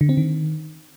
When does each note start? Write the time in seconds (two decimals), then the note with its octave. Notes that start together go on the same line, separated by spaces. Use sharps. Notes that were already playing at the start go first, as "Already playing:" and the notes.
0.01 D3
0.09 C4
0.17 D#3